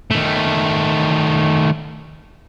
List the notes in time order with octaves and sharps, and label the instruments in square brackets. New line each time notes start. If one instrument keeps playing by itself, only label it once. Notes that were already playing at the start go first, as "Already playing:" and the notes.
[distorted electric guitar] D#3 A3